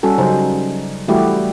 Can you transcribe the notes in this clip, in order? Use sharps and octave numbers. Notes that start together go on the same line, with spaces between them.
G3 C#4 F#4 A4
C#3 F#3 D#4 C5
E3 G3 A3 E4 F#4 G4